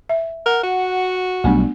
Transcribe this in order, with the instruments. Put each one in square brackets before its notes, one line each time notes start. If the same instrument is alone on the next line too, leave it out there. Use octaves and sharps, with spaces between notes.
[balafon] E5
[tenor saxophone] A#4 [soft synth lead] F#5
[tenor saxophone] F#4
[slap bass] B1 [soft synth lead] G3 [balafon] A3 B3 D4